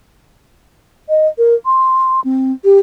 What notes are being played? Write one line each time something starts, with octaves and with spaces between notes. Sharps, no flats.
D#5
A#4
C6
C4
G4